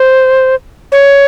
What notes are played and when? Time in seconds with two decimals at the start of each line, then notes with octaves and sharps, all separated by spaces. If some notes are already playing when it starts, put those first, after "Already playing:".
Already playing: C5
0.92 C#5